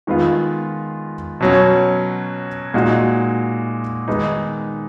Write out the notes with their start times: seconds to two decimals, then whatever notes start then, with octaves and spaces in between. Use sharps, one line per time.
0.07 D#3 G#3 B3 F4
1.40 B2 F#3 C#4
2.74 A#2 G#3 D#4 F#4
4.08 D#3 G#3 B3 D#4